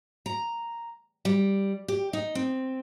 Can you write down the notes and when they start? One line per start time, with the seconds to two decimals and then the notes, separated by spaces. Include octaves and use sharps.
0.26 A#5
1.25 G3
1.88 G4
2.13 D#4
2.35 C4